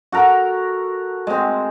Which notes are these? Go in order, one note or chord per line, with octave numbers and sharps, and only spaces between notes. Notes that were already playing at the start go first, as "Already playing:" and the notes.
F#4 A4 A#4
G#3 C4